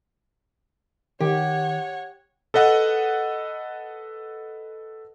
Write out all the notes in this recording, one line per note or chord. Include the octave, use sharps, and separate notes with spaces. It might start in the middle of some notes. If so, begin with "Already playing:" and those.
D#3 G4 C#5 F#5
A4 B4 D#5 F#5